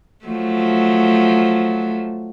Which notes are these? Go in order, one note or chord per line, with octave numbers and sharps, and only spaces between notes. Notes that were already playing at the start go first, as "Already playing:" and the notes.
F3 F#3 A3